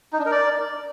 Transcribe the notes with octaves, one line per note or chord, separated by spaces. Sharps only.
D#4
D4
A#4
D5